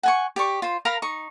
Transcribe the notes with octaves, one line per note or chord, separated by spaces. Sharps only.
F#5 G#5 C#6
G4 D5 C#6
F4 C5
A#4 F5 A#5 B5
D#4 C#6